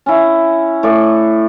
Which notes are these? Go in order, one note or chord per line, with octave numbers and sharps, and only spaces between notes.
C#4 E4
A2 D5 C#6